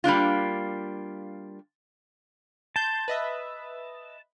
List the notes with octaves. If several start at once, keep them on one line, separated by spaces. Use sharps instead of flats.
G3 A#3 D4 F4
A5 C6 G6
B4 D#5 E5